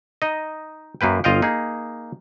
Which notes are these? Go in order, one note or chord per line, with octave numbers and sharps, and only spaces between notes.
D#4 D#5
F#2 A#3 B4 G5
G1 F4 D#5 F5 G5
A#3 D#4 G#4